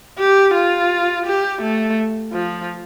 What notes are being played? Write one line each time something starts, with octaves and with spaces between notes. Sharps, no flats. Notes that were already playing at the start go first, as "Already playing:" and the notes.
G4
F4
G4
A3
F3